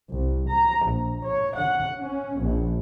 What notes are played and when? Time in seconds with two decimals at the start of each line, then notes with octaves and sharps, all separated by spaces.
0.13 C2
0.49 A#5
0.90 A#1
1.25 C#5
1.57 F#5
1.99 C#4
2.39 A#1